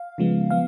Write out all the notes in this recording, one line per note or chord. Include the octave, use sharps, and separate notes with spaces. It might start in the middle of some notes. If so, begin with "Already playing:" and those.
Already playing: F5
C#3 F3 G#3 B3
F3 B3 F5